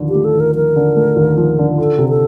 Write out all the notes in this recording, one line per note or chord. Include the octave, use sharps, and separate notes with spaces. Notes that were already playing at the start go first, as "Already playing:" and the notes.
Already playing: D#2 D3 F3
G4
A3
A4
D#2
A#4
F3 A#4
D3
A3
D#2
F3
D3
F4 A4
C3
A4